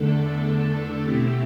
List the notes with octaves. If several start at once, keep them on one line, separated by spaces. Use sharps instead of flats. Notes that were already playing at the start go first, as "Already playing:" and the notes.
Already playing: E2 D3 A3 D4 A4
B2 A3 C4 E4 G4